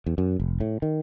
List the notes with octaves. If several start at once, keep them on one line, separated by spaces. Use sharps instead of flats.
E2
F#2
F1
A2
D#3